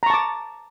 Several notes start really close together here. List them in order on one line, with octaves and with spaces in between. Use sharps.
A#5 C#6 A5 D6